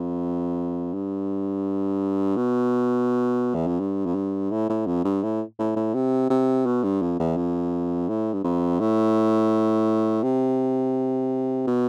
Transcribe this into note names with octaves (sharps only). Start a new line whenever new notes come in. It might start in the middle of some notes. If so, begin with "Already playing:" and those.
Already playing: F2
G2
B2
E2
F2
G2
F2
G2
A2
A2
F2
G2
A2
A2
A2
C3
C3
B2
G2
F2
E2
F2
A2
G2
F2
A2
C3
B2